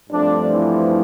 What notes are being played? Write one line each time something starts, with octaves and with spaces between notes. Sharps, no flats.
G2 F3 A3 C4 D4
E3 E4